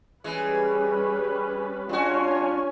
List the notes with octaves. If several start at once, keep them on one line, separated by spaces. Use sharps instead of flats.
E3 G3 G#3 C#4 B4
G3 C#4 D4 F4 F#4 C#5 G#5